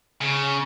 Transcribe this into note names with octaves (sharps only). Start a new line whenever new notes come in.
C#3